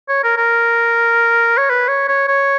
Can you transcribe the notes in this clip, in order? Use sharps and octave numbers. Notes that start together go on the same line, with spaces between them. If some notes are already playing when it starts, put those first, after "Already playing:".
C#5
A#4
A#4
C#5
B4
C#5
C#5
C#5